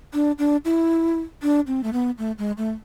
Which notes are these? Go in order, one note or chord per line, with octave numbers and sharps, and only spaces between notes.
D4
D4
E4
D4
C4
A3
B3
A3
G#3
A3